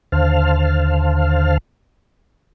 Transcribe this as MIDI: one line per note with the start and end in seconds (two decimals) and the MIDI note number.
0.12 1.58 39
0.12 1.58 50
0.12 1.58 72
0.12 1.58 77
0.12 1.58 81
0.12 1.58 89